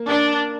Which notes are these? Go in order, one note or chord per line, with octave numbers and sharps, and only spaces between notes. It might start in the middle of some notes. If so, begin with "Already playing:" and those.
Already playing: A#3
D4 A#4